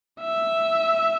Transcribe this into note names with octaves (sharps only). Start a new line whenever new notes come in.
E5